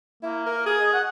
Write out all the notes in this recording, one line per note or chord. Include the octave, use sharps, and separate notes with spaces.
A#3 E4
A#4
G#4
D#5
F#5